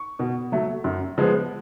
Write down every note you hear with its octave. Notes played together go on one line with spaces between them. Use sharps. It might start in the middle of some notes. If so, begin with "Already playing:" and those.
Already playing: C#6
B2
F#3 A3
F#2
F3 G#3 B3